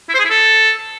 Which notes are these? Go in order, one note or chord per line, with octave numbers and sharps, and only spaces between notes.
E4
C5
G#4
E4
A4